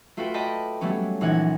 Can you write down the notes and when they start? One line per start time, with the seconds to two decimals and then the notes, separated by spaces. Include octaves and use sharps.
0.17 A3 F4 F#4 A4 B4 G5
0.34 D5 D#5 G5 A5 B5
0.81 F#3 G3 A3 B3 C#4
1.21 A#1 E3 D#4 F#5 G#6